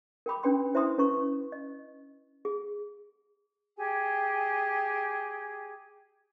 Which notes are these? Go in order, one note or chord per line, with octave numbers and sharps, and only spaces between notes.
A#4 G5 B5 D6
C#4 D4 B4 G5 C6
E4 C5 E5 A#5 C6 D#6
C#4 B4 A#5 C#6
D#5
G#4
G4 G#4 G#5